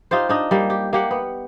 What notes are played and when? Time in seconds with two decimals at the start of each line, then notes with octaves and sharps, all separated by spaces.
0.11 D#4 F4 G4 C5
0.29 D4 D#4 D#5
0.51 G3 A#3
0.70 G4
0.93 A#3 G4 F#5
1.11 B3